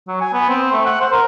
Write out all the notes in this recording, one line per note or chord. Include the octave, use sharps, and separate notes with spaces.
F#3
G#5
B3
C4
A3
F#5
C5
A#4